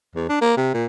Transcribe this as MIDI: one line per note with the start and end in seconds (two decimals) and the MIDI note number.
0.15 0.27 40
0.29 0.41 62
0.41 0.56 58
0.57 0.72 48
0.74 0.86 46